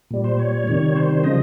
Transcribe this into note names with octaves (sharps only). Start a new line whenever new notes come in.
A#2 G3
C5
C#5
C3 D#3 G3
C5
C#3 F3 D#5